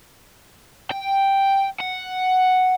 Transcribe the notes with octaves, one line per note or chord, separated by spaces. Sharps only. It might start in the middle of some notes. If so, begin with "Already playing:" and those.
G5
F#5